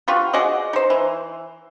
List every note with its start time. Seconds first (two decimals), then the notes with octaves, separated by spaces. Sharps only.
0.08 G3 F4 F#4
0.33 F#4 G#4 D5 D#5
0.73 D#4 C5
0.90 E3